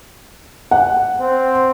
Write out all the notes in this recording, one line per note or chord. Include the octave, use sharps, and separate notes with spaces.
F#5
C4